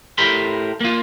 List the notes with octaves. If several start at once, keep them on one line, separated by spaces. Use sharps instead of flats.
A2 G4 A#4 B5 C6
A#3 F4